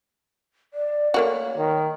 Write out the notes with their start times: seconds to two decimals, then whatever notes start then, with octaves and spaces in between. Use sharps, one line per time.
0.74 D5
1.14 A3 A#3 F#4 C#5
1.58 D#3